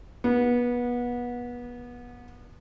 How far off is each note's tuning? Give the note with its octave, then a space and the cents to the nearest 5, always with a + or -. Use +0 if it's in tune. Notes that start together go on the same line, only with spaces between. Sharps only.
B3 -25